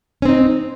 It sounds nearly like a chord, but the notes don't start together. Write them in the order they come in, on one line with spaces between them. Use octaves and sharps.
C#4 C4 D#4